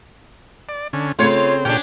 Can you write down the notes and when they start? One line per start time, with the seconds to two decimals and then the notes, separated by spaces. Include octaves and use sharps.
0.69 D5
0.93 D3 C#4
1.19 C#3 A3 C4 F4 C#5
1.65 A#2 C#4 D4 G4 G5